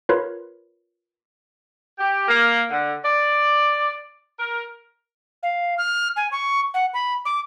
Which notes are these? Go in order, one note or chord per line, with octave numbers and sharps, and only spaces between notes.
F4 A#4 B4 C#5 B5
G4
A#3
D3
D5
A#4
F5
F6
G#5
C#6
F#5
B5
D6